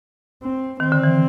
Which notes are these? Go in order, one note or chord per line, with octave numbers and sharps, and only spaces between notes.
C4
D#3 C4
D3
E3